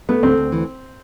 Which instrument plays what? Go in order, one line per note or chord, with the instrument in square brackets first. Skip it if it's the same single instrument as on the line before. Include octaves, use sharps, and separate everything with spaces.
[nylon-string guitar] A3 [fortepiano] B3
[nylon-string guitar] D2 [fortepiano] C4
[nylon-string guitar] D2
E3